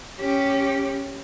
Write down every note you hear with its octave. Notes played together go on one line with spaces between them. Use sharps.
C#4 G4